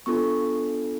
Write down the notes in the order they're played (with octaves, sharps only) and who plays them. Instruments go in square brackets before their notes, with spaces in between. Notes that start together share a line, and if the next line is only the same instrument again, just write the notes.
[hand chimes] B3 D4 F4 A4 C#6